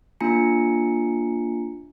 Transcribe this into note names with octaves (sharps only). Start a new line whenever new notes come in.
A#3 D4 F4 G#5 A#5 C#7